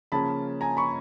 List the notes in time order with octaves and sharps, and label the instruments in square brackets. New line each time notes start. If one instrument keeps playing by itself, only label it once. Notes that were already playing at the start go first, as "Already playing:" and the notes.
[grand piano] C#3 F3 A#3 C#4 A5 B5
G#5 A#5
B5 C#6